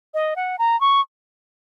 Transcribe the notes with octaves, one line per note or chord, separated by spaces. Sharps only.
D#5
F#5
A#5
C#6